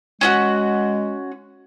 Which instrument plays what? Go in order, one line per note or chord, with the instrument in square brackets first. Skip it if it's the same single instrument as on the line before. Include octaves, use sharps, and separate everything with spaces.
[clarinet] G#3 [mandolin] C#4 E4 F#4